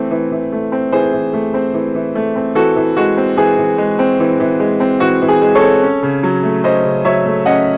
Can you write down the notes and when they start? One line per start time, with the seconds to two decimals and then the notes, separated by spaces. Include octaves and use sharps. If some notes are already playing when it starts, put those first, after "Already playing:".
Already playing: E3 A3 C4
0.11 E3
0.32 E3
0.52 A3
0.72 C4
0.92 E3 G#4 C5
1.13 E3
1.33 A3
1.54 C4
1.74 E3
1.95 E3
2.15 A3
2.36 C4
2.55 E3 F#4 A4
2.76 E3
2.96 G#3 F#4
3.17 C4
3.37 E3 G#4
3.58 E3
3.78 G#3
3.99 C4
4.20 E3
4.40 E3
4.60 G#3
4.80 C4
5.00 E3 F#4
5.22 E3
5.28 G#4
5.42 G#3
5.55 A4 C#5
5.62 C4
5.82 C#4
6.03 C#3
6.23 F#3
6.43 A3
6.63 C#4 C5 D#5
6.84 C#3
7.05 F#3 C#5 E5
7.26 A3
7.46 C#4 D#5 F#5